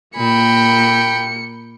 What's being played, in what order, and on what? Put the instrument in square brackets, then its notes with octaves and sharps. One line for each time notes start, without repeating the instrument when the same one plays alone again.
[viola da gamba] A#2 [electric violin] A#3 C#7 [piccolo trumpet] G5 [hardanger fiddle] B5